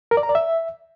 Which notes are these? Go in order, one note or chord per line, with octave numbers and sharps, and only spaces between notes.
A#4
D5
A#5
D5
E5